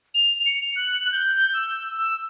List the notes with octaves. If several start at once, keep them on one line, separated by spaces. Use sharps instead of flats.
F7
C#7
F#6
G6
E6
E6